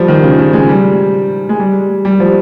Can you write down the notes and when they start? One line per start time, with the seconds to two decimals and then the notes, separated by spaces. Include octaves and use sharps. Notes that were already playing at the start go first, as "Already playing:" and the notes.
Already playing: F3 G3
0.08 D#3
0.23 C#3
0.39 C#3
0.53 G#3
0.69 G3
1.49 G#3
1.60 G3
2.05 G3
2.20 F3